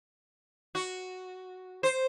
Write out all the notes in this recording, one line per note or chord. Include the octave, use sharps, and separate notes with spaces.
F#4
C5